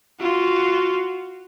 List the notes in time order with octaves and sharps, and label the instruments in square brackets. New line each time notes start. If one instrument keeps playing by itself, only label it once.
[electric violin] F4 F#4